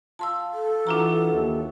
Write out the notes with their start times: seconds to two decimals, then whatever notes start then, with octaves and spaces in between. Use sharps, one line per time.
0.19 F4 F5 A5 C6 E6
0.53 A4
0.87 E3 D4 F4 F#4 F#5 A#5
1.33 D#2 E5